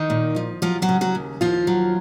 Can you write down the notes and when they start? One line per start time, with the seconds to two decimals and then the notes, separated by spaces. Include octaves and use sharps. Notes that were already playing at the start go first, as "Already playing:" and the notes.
Already playing: D#3 D#4
0.10 A#2
0.36 F3
0.62 F3 F#3 F4
0.82 F#3 F#4
0.89 C#3
1.01 F#3 F#4
1.15 D#2
1.41 D#2 F3 F4
1.67 F#3